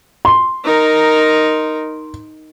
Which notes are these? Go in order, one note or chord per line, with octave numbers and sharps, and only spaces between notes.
C6
D#4 A#4